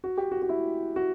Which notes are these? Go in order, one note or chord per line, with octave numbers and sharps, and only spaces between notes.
F#4
G4
F#4
F#4
E4
F#4